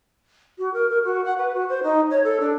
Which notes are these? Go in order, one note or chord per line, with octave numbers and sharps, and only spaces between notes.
F#4
A#4
A#4
F#4
F#5
B4
F#4
C5
D#4
C#5
A4
D4